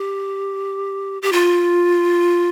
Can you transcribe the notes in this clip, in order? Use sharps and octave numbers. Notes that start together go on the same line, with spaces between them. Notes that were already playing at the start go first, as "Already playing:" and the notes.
Already playing: G4
G4
F4